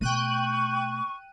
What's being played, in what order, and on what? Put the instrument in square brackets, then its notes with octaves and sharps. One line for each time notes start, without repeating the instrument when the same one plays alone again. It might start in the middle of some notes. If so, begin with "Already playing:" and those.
[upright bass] B2 A3 [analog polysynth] G5 F#6 D#7 [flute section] C#6